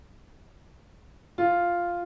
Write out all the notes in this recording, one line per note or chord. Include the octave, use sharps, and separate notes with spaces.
F4